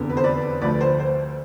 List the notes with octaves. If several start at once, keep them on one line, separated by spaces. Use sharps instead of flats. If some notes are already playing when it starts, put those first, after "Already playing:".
Already playing: F1 E2 D3
B4
C5
B4 D5
D2 D3 F3 A3 B4 D5
C5
C5